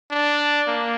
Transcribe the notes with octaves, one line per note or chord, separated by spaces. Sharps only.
D4
A#3